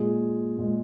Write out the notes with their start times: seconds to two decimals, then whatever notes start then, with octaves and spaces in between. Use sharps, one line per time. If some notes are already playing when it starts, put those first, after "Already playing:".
Already playing: A#2 G#3 G#4
0.58 A#2 G#3